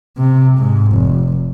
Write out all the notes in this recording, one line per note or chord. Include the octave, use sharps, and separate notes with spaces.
C3
G#2
F1